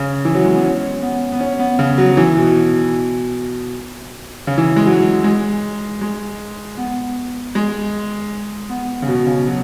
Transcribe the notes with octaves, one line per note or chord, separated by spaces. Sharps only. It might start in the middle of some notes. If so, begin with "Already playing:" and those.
Already playing: C#3
E3
F#3
G#3
B3
C#4
B3
B3
C#4
B3
C#3
F#3
F#3
E3
B2
C#3
E3
G#3
F#3
G#3
G#3
B3
G#3
B3
C#3
B2
C#3
F#3